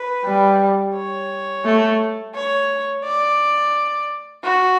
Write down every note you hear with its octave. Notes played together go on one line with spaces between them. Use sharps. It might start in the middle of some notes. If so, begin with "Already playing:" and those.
Already playing: B4
G3
C#5
A3
C#5
D5
F#4